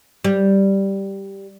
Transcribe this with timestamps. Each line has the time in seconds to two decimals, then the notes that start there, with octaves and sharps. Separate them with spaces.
0.24 G3